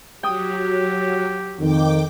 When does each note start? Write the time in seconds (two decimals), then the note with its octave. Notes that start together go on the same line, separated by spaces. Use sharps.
0.23 F#3 G4 G5 D#6
1.60 F2 D#3 G5 D6